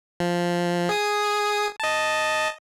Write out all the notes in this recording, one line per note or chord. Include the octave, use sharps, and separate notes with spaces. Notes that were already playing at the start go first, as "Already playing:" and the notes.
F3
G#4 D#6
D#5 A5